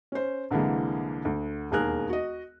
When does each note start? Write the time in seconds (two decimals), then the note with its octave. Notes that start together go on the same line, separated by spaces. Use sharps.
0.12 C#4 C5
0.51 C2 D3 E3 G#3 A#3
1.25 D2
1.71 E1 D#2 G#4 A#4 F#6
2.09 F#4 D#5